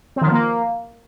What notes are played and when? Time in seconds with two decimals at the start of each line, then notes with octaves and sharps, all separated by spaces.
0.16 C4
0.22 D#3
0.27 F3
0.32 A#3